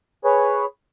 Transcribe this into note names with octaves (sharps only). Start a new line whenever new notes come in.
G#4 B4 C#5